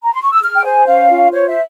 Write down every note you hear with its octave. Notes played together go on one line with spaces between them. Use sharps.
A#5
C6
C#6
E6
G#4 F6
G5
C5 G#5
C#4 F5
F4
C5 C#5
E5